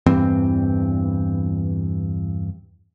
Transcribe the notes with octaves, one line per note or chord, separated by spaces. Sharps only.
E2 G2 E3 C4